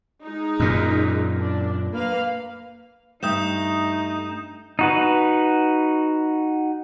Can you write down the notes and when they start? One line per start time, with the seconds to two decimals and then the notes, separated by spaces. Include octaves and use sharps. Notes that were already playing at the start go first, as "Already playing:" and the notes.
0.23 G#3 D#4
0.60 F#2 A#2
1.37 D4
1.93 A#3 B4 F5
3.23 G2 A3 D#4 D#6 G6 E7
4.79 D#4 F#4 B4